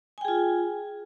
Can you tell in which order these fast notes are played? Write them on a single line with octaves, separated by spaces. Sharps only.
G#5 G5 G#4 F4